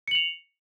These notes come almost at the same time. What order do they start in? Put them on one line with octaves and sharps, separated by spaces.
C#7 F#7 F7